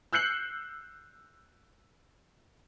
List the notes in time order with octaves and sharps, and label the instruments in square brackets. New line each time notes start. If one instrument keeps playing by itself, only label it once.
[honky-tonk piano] E6 F#6 G6 C7 C#7 F#7